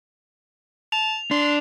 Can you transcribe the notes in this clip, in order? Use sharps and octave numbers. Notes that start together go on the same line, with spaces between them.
A5 F7
D4 C6